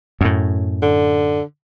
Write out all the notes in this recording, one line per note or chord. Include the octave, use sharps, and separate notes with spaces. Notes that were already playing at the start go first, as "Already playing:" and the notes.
F#2 A2
D3